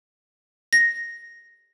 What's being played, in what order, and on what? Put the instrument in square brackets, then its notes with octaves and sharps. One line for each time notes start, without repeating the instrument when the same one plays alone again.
[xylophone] A#6